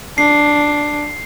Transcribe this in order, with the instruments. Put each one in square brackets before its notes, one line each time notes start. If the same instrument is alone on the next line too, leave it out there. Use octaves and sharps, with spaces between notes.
[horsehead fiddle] D4 [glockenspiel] C7